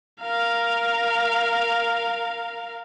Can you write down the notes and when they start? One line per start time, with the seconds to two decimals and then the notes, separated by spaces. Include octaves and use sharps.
0.22 A#4 F5